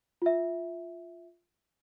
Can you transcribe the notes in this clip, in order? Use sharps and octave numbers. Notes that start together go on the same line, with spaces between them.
F4 E5